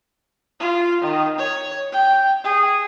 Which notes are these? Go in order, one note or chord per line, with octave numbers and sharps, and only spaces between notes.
F4
D#3
C#5
G5
G#4